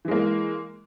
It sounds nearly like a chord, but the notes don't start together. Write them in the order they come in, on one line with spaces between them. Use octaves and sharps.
E3 G#3 A#3